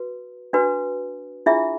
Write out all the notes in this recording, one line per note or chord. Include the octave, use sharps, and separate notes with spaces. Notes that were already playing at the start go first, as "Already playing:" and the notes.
Already playing: F#4 B4
D4 F#4 B4
D4 E4 F4 G#4 E5